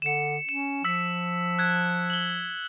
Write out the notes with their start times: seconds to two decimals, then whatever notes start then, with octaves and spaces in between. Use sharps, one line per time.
0.02 D3 C#7 E7
0.49 C#4 E7
0.85 F3 E6 B6
1.59 F#6 G#6
2.10 F#7 G7